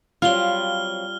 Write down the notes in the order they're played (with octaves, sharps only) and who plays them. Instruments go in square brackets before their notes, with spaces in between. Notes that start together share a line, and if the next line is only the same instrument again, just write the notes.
[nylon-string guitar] F#3 C4 F5 [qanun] G3 F4 [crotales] F6 G7